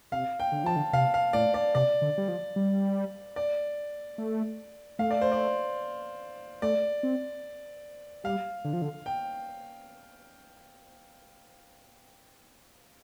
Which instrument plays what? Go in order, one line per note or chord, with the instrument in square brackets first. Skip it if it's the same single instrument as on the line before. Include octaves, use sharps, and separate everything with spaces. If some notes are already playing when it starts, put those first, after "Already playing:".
[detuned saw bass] C3 [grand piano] F5
[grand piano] G5
[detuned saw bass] D3
[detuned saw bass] F3 [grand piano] A5
[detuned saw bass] D3
[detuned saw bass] C3 [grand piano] F5
[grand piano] F5
[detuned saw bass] A2 [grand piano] D5
[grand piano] D5
[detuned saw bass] C3 [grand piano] D5
[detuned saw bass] D3
G3
F3
G3
[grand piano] D5
[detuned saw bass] A3
[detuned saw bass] A3 [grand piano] F5
[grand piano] D5
C5
D5
[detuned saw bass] A3 [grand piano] D5
[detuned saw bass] C4
[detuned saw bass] G3 [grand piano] F5
[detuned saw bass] D3
F3
D3
[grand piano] G5